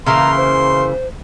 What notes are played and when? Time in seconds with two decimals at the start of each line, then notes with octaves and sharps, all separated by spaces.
0.06 C#3 E3 A#3 A#5 C6
0.37 C5